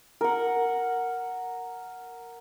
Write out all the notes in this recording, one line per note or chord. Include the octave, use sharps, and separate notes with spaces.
A#4 F#5